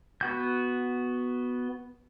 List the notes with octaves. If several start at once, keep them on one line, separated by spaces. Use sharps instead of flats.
B3 F#4 G6